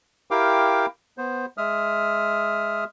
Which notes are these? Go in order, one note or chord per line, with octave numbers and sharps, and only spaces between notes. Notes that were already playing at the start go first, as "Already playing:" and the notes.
E4 G4 A#4 F5 G5 D6
B3 C5
G#3 E5 D#6 F6